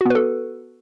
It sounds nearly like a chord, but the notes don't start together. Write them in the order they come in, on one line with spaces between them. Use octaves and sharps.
F#4 B3 B4 A4